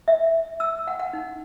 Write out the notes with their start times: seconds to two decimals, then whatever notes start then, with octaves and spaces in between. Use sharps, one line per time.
0.08 E5
0.60 E6
0.87 F#5
0.99 F#5
1.13 D#4